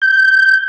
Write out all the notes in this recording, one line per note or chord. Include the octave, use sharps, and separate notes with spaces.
G6